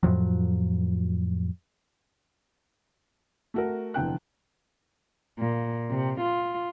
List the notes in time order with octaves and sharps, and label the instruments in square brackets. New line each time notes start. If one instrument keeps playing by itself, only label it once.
[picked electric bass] F2 A2 F3 F#3
[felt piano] A3 F#4 A#4
F1 E2 D3 G5 F#6
[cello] A#2
C3
F4